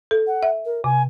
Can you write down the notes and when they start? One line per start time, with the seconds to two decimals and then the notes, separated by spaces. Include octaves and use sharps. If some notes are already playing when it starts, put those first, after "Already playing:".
0.11 A4
0.26 F#5
0.43 E5
0.65 A#4
0.84 C3 G#5